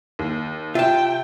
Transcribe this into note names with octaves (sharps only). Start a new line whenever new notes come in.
D#2
C3 F4 E5 G5 A5